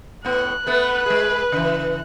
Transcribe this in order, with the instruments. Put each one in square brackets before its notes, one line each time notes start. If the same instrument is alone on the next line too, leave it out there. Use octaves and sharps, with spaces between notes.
[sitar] A2 B3 [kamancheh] F#6
[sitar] A3 B3 [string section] B4
[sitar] G#3 G#4
C#3 E3